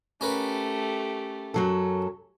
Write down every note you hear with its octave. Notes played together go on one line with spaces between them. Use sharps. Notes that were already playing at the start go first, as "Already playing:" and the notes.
A3 C#4 G4 A#4 B4
F#2 F#3 A4